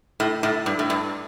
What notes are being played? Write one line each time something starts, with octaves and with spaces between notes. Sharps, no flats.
A2
A2
G2
A2
G2